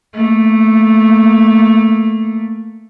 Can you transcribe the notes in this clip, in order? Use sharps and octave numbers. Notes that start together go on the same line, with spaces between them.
A3 A#3